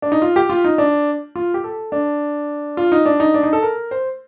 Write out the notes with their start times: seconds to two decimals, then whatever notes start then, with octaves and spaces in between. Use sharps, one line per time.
0.02 D4
0.12 D#4
0.22 F4
0.36 G4
0.49 F4
0.64 D#4
0.78 D4
1.36 F4
1.54 G4
1.64 A4
1.92 D4
2.77 F4
2.92 D#4
3.06 D4
3.20 D#4
3.34 D4
3.43 D#4
3.53 A4
3.63 A#4
3.91 C5